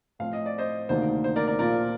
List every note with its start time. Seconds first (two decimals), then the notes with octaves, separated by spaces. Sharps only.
0.19 A2 F3 C4 F5
0.33 D#5
0.46 D5
0.58 C5 D#5
0.89 D2 C3 D#3 A#3 D#4 C5
1.24 C5
1.36 A#4 D5
1.47 A#4 D5
1.59 A#2 F3 A#3 F4 A#4 D5